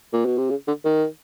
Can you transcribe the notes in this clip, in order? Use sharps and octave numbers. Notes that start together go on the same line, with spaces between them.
A#2
B2
C3
C#3
D3
D#3